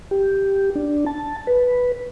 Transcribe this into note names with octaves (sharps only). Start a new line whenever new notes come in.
G4
D4
A5
B4